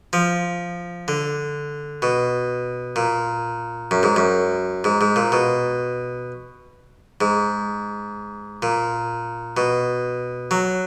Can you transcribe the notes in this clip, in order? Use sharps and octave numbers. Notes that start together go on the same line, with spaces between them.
F3
D3
B2
A#2
F#2
G#2
F#2
G#2
G#2
A#2
B2
G#2
A#2
B2
F#3